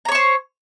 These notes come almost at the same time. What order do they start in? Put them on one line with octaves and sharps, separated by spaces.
A#5 C#5 C#6 C5